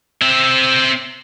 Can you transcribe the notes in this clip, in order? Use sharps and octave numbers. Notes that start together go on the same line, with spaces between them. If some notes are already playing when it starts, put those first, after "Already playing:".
C4 E5